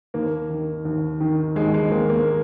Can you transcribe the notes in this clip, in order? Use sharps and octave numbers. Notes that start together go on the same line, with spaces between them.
D#2 A#3
D#3
D#2
D#3
D#2 G#3
G#3
D#3 A#3
A#3